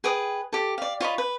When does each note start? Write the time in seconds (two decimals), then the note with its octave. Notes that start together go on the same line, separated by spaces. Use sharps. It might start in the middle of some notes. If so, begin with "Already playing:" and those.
0.04 G#4 B4 G5 D#6
0.53 G4 A4
0.78 D5 F5
1.01 F4 C#5 D#5 B5
1.18 B4